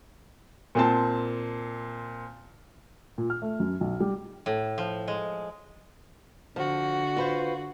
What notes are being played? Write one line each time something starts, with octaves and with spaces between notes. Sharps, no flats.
A#2 C4 A5
A#2
F6
A3
F#2
B1
G3
A2
F3
G#3
D3 F3 F#4
F4 B4 C5